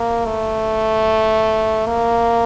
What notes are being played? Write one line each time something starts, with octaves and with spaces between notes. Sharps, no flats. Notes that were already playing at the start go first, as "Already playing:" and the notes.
Already playing: A#3
A3
A#3